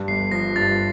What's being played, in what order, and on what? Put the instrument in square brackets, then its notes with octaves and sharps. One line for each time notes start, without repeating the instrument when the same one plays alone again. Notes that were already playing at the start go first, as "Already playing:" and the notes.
Already playing: [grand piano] G2
[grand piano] G1 [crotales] C7
[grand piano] F3 [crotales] A#6
[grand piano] G2 [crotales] A6